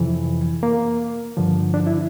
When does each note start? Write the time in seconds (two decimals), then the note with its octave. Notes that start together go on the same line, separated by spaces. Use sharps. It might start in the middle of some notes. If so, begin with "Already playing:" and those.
Already playing: F2 C3 E3
0.63 A#3
1.37 G2 D3 F3
1.74 D4
1.87 E4